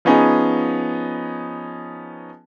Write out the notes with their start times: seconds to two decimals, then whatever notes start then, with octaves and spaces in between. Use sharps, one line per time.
0.05 F3 B3 C#4 D#4 G#4